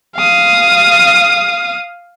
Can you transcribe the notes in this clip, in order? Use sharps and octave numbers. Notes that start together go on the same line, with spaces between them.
F5 D#6